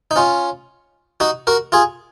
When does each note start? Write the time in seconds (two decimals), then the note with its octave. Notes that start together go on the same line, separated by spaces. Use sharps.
0.11 D#4
0.16 C#4 F4
1.20 D#4 F#4
1.47 F#4 A#4
1.72 F4 G#4